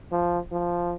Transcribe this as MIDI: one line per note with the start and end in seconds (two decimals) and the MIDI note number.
0.12 0.39 53
0.51 0.95 53